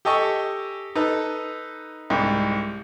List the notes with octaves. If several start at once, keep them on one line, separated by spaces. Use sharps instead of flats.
G4 A4 D#5 G#5 C#6
D#4 A4 B4
C2 G#2